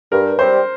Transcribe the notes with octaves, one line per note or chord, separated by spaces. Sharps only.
G2 A#4
G3 C4 C5